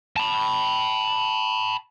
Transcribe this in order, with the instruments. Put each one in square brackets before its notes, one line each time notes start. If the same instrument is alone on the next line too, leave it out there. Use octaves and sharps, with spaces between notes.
[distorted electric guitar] A5 B5